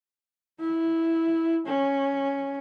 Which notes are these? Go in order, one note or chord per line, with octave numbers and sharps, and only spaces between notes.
E4
C#4